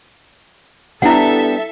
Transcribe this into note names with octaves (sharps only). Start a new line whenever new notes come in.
G3 B3 D4 E4 A4 E5 F#5